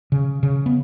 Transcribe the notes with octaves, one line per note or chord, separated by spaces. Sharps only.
C#3
C#3
B3